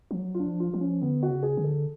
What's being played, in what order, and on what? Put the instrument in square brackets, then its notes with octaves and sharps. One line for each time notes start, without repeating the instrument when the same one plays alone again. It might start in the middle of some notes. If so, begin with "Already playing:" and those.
[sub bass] F3
F#3
[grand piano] F4
D4
[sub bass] F3
[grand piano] F4
[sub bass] F3
[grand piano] C#4
[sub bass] D3 [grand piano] B3
[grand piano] F#4
[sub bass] C#3
[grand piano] G#4
[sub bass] D3
[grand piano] A4